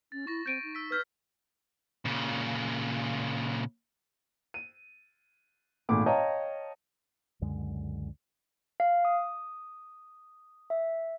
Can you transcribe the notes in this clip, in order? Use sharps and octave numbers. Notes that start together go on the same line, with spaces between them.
C#4 A6
E4 C#6 A#6
C4 G6 D7 D#7
D#4
E6 B6
B4 E6 F6 G6 B6
A#2 C#3
D#7
G#1 A#2 A3 D6
C#5 D#5 F5 G5 A5 A#5
C#2 F#2 D3 G#3
F5
D#6
E5